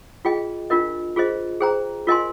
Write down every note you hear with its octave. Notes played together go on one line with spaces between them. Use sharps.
F4 G#4 D#5 G5
D4 F4 A#4 D#5
F4 G#4 C5 D#5
G#4 C5 G5 A#5
F4 A#4 D#5 G#5 C6